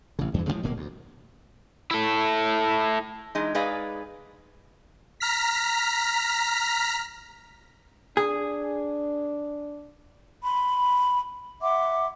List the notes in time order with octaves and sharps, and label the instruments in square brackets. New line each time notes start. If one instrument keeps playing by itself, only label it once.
[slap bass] A1 C#3
E2 G2 E3
A2 C#3 F3 G#3
D1 B2 A#3
D2
[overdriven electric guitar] E4 A4
[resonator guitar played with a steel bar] E3 G#3 D#4
G#3 D#4 G#4 B4 D5 F5
[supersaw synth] A#5 F6 B6
[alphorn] D4 [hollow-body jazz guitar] G#4
[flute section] B5 C6
E5 F#5 C6 D6